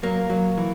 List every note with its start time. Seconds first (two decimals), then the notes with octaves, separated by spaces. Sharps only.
0.03 F#3 A#3
0.30 F#3
0.57 E3